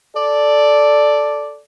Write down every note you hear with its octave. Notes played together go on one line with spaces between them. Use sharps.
A4 D5